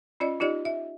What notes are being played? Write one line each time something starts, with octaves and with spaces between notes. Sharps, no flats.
C#4 F4 D5 D#5
D#4 F4 G4 D5 D#5
E5